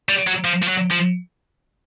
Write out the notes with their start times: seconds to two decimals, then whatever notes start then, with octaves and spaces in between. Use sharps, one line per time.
0.09 G3
0.27 F#3
0.44 F3
0.62 F3
0.68 F#3
0.90 F3